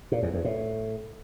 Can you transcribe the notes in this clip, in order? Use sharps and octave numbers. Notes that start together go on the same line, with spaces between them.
A#2
E2
E2
A2